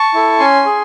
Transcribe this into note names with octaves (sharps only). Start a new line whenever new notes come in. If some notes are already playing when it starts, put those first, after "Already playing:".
Already playing: A5 C#6
E4 A4
C#4 G#5 C6
G#4